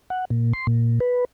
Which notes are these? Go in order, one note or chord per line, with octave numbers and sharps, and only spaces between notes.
F#5
A#2
C6
A#2
B4